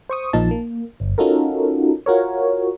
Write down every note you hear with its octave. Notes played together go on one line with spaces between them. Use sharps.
C5 C#6 D#6
A#1 A#2 F3 D#4 A5
A#3
G1
C#4 D#4 F4 F#4 A4 A#4
F4 F#4 A#4 C#5